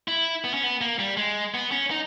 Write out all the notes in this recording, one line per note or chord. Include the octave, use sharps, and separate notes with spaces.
E4
B3
C#4
B3
A#3
G3
G#3
B3
C#4
D#4